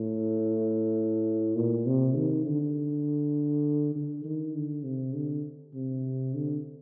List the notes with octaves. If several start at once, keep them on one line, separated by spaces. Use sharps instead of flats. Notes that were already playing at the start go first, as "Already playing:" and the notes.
Already playing: A2
A#2
C3
D#3
D3
D3
D#3
D3
C3
D3
C3
D3